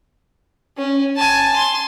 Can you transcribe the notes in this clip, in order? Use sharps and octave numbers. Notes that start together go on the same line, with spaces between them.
C#4
G#5 A5
C6